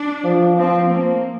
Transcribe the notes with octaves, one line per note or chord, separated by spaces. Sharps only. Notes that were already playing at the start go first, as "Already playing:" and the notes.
Already playing: D4
F3
F3 C4
A#3